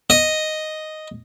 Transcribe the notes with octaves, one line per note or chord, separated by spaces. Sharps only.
D#5